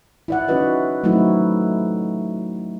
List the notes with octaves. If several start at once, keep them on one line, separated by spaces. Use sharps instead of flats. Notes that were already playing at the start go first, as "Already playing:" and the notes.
E4 D5 F#5
C#4 D#4 E4 F#4 B4 D#5
F#3 A3 C4 D#4 E4 F#4